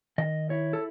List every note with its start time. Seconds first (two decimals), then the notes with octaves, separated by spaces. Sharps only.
0.18 D#3 D#5
0.50 E4 C#5
0.73 A4